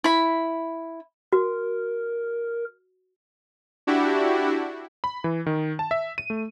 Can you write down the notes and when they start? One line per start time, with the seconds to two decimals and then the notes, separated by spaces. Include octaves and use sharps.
0.04 E4 B5
1.33 F#4 A#4
3.87 D4 E4 F#4 G4
5.04 B5
5.24 E3
5.46 D#3
5.79 A5
5.91 E5
6.18 D#7
6.30 A3